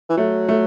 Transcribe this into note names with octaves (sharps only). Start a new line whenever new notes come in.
E3
F#3 A3
A3